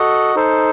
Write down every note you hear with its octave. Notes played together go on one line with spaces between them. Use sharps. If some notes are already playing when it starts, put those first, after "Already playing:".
Already playing: F#4 A4 D#5 F#5
D#4 A4 C5